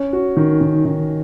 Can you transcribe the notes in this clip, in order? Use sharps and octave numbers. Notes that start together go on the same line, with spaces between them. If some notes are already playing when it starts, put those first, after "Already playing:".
Already playing: C#4
F#4
D#3
D#3
D#3